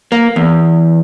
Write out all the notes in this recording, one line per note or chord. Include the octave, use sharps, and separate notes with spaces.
A#3
E2